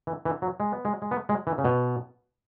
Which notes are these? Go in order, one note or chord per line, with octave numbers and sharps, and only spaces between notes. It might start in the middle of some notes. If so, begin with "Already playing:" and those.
E3
E3
F#3
G#3
B3
G#3
G#3
B3
G#3
E3
C#3
B2